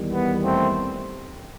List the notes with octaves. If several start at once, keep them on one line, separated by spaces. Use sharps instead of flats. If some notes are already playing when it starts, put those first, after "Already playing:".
Already playing: E2 D#3 G3
B3
A3 C4